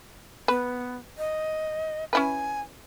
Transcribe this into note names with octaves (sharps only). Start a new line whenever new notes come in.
B3 B4
D#5
C#4 E4 B4 G#5